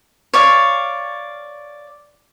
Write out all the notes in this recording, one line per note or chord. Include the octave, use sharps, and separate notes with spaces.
C#5 D5 F5